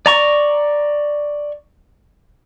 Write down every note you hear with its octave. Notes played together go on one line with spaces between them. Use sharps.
D5 A#5 C#6